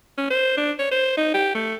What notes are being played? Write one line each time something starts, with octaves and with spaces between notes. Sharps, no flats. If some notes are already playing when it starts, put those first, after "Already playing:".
C#4
C5
D4
C#5
C5
D#4
G4
A3